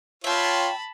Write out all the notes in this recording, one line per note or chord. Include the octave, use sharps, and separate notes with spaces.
F4 C#5 E5 G5 A5 B5